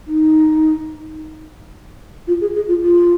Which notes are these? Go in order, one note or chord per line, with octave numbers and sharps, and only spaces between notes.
D#4
F4
G#4
G#4
F4
F4